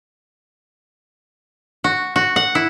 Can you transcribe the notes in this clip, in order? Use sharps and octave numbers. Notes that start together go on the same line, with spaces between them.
F#4
F#4
F#5
E4